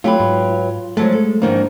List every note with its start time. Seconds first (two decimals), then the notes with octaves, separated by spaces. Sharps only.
0.04 F#3 A3 F4 G4 B4
0.20 G#2
0.97 F3 F#3 G#3 A3 A5
1.12 A4
1.42 G#2 D#3 F3 A#3 D4 A#4